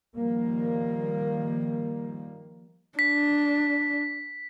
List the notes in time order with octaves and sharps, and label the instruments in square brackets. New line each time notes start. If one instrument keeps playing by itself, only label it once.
[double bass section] D#3 F3 G3 A#3
[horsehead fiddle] D4 [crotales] B6